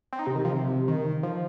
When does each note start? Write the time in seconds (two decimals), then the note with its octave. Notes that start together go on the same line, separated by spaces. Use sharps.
0.13 C4
0.19 D#4
0.27 C3
0.36 D#3
0.45 F3
0.53 C3
0.88 D#3
1.23 F3